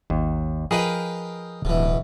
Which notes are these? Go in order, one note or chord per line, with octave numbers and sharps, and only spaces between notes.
G#1 D#2
F3 G#4 A#4 B4 D#5 F5 G5
D1 B2 E3